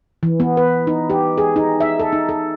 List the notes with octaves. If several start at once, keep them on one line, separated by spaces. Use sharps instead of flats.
E3
B3
B4
D#4
G4
G#4
D#4
E5
A4
D#4
A4